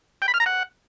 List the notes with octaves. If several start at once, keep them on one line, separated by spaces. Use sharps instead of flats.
G5
B5
F6
A#5
F#5